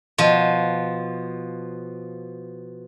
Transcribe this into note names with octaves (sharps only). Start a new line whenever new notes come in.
B2 F3